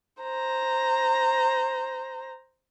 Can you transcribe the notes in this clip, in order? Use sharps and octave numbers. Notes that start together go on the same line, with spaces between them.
C5 A#5